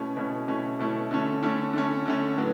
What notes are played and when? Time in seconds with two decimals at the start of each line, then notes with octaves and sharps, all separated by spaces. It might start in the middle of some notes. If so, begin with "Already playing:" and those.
Already playing: B2 A3 C#4 E4
0.17 B2 A3 C#4 E4
0.48 B2 A3 C#4 E4
0.79 B2 A3 C#4 E4
1.11 D3 A3 C#4
1.43 D3 A3 C#4
1.73 D3 A3 C#4
2.06 D3 A3 C#4
2.37 A2 F#3 B3